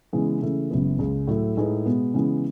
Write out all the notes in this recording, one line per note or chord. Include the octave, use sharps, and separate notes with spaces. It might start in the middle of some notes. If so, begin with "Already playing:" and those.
C#3 E3 G#3 B3
C#3 E3 A3
F#1 F#2 C#3 G#3 B3
C#2 C#3 G#3
A2 F#3 A3
A2 G#3 D#4 G#4 B4
B2 G#3 B3
C#3 E3 G#3 B3